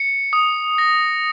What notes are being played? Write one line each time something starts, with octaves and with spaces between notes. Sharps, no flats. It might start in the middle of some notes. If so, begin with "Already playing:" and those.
Already playing: C#7
D#6
A#6